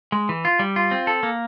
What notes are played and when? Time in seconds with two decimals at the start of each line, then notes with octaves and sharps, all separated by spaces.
0.12 G#3
0.29 E3
0.45 F4
0.59 G3
0.76 F4
0.91 C4
1.07 A4
1.23 A#3